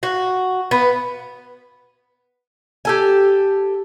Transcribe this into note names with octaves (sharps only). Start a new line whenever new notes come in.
F#4
B3
G4 A4 G#5